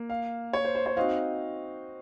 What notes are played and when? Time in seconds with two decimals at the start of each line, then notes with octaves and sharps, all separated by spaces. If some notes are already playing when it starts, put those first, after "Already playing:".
Already playing: A#3
0.10 F5
0.53 C#5
0.65 C5
0.75 C5
0.86 C#5
0.96 C4 D#4 F#4 C5 D#5 F5